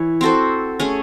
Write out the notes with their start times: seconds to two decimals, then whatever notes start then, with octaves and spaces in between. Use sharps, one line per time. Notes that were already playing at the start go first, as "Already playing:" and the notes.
Already playing: E3 C#5
0.21 C4 F#4 A4 C5
0.80 A3 C#4 G#4